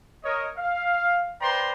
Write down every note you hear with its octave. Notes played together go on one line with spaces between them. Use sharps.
A#4 C#5 D#5
F5
B4 C5 D5 G5 A#5 C6